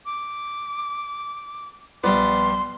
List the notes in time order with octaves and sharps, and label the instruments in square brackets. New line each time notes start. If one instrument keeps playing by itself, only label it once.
[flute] D6
[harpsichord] A#1 G3 D5 [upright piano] B3 [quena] C6